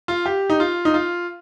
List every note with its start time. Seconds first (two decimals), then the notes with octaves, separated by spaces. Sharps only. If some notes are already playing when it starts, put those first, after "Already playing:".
0.08 F4
0.26 G4
0.50 D#4
0.60 F4
0.85 D#4
0.94 F4